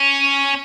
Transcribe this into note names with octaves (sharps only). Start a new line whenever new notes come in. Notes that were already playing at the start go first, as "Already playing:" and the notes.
Already playing: C#4